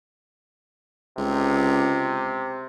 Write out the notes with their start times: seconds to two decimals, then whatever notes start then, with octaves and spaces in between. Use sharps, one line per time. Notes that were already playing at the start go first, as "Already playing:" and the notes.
1.18 C#2 C3